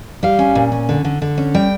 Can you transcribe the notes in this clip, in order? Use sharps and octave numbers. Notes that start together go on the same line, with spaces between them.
G3 F5
C#4
A#2
C#4
D3
D3
D3
C#4
G3 G5